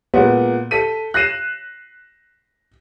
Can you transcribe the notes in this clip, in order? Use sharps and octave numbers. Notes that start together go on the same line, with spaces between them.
A#2 G#3 B3 F#4
A4 B6 D#7
F#6 A#6 C7 D#7 E7